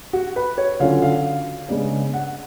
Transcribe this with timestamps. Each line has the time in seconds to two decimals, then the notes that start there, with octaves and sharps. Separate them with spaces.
0.13 F#4
0.36 B4
0.58 C#5
0.80 D3 F#3 C#4 F4 F5
1.02 F5
1.69 C#3 G#3 B3 D4
2.14 F#5